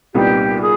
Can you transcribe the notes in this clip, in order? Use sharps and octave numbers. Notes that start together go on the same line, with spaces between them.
C2 A#2 G3 B3 D#4 G4
G#4